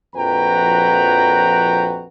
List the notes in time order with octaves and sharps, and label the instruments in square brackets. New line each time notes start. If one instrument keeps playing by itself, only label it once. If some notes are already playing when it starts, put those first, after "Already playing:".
[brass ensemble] A#1 F2 F#4 B4 G5 A#5